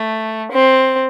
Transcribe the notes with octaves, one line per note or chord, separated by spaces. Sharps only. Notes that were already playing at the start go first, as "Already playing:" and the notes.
Already playing: A3
C4